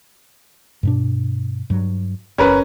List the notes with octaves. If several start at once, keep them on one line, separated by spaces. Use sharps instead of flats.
G2 B2 D4
G2 F#3
F#1 C#4 A#4 B4